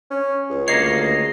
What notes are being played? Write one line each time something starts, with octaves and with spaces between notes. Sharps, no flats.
C#4
C#2
D2 A#3 C#5 D#5 C7